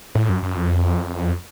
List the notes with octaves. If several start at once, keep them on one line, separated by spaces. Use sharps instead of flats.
A2
F#2
F#2
F2